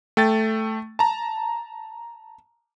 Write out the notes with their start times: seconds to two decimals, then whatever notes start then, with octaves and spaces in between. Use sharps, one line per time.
0.17 A3 G5 A6
0.99 A5 A#5